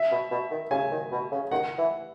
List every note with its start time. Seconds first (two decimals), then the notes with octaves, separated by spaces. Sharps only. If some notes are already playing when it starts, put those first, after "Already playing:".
Already playing: E5
0.11 B2
0.31 B2
0.50 D#3
0.71 C#3 G#5
0.91 D#3
1.11 B2
1.31 C#3
1.51 D#3 F#5
1.78 E3